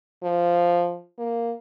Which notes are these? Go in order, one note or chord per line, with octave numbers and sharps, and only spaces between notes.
F3
A#3